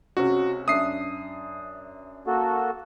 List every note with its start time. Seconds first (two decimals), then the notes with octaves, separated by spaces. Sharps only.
0.17 C#2 C3 C#4 F#4
0.68 F#2 D4 E5 D#6 C7
2.27 A#3 F#4 A4